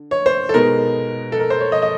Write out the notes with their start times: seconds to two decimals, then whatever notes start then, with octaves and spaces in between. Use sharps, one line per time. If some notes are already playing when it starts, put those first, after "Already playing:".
Already playing: D3
0.11 C#5
0.26 C5
0.49 A4
0.54 B2 G#3 B3 D#4 A#4
1.32 A4
1.40 A#4
1.50 C5
1.61 C#5
1.72 D#5
1.82 D#5